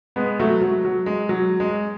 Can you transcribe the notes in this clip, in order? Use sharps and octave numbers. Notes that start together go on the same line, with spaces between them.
G#3 B3
F#3 A3
F#3
F#3
G#3
F#3
G#3